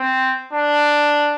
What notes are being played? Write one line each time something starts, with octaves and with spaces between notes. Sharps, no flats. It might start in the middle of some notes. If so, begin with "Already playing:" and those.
Already playing: C4
D4